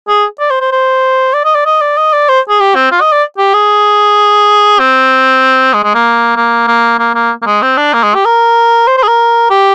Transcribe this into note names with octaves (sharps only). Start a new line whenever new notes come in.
G#4
D5
C5
C5
C5
D5
D#5
D5
D#5
D5
D#5
D5
C5
G#4
G4
C4
F4
D#5
D5
G4
G#4
C4
G#3
G#3
A#3
A#3
A#3
A#3
A#3
A#3
G#3
C4
D4
A#3
G#3
G4
A#4
C5
C5
G#4
A#4
G4